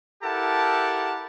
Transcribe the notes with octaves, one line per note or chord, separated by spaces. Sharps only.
E4 G4 A4 A#4 F#5 A5